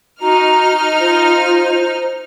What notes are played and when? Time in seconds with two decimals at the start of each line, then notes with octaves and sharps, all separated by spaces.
0.22 D#4 F#4 A#5 F6
1.00 F4 C5